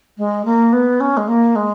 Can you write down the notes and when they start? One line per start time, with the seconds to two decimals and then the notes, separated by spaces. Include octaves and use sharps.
0.17 G#3
0.45 A#3
0.72 B3
1.00 C#4
1.17 G#3
1.28 A#3
1.55 G#3